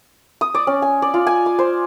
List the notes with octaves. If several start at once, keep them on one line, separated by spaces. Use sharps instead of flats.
D#6
D5
C#4
G#5
D5
F4
G#5
D6
C5